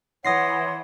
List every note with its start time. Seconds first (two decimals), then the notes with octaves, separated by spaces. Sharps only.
0.25 E3 C#5 F#5 C6 D#6 A#6 C7